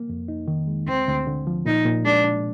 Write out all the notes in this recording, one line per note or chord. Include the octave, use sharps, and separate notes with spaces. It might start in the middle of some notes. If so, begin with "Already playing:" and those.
Already playing: A#3
F2
D#4
D#3
G#3
D2 C4
D2
D3
F3
A#2 D#4
A#2
G#3 D4
D4